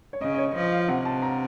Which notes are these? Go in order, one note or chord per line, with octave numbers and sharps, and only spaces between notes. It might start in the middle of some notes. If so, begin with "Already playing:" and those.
C#5
C#3 D#5
D#5
C#5
F3 D#5
F5
C3 F#5
A5
A#5